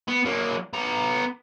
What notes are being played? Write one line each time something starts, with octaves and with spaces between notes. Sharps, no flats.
B3
F#3 A#3
B3 A#5